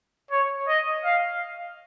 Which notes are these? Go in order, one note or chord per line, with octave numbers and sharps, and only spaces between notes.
C#5
D#5
F5